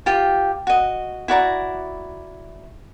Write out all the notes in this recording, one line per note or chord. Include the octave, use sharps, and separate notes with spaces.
F4 G4
F#4 D#5
E4 F#4 D5 A#5